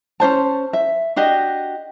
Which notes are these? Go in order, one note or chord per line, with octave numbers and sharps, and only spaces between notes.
C#4 D4 C5 A5
E5
D4 F#4 G4 D#5